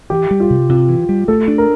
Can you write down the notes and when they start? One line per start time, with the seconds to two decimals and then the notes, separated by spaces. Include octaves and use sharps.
0.10 E3 G4
0.31 G3
0.40 F4
0.50 C3
0.69 C3 F4
0.89 E3
1.09 G3
1.28 A3 A4
1.48 D4
1.58 A#4